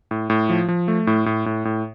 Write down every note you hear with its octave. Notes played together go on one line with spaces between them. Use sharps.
A2
A2
F3
F3
A3
A2
A2
A2
A2